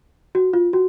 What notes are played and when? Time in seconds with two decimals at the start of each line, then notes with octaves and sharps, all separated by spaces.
0.35 F#4
0.53 F4
0.73 F#4